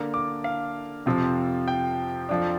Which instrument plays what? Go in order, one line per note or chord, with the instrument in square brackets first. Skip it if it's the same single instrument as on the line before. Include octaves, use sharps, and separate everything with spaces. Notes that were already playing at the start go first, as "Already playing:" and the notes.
Already playing: [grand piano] D3 A#3 D4 F6
D6
F5
F2 C3 F3 C4
G5
F2 F3 D4